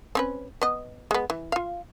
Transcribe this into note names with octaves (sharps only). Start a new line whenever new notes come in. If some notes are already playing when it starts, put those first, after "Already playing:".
C4 C#4 B4
B3 D#5
G#3 B3
E3
F4 F5